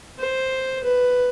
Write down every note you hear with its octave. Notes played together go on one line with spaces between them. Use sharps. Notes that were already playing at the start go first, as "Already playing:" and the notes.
C5
B4